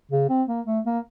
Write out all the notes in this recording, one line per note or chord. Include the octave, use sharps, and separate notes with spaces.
C#3
C4
A#3
A3
A#3